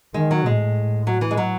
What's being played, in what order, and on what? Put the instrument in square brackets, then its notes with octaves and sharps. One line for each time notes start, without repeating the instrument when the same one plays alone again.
[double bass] D#3 [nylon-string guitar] G#3
[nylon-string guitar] F#3
[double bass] A2 [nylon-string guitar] G#3
[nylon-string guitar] F#3
E3
G#3
F#3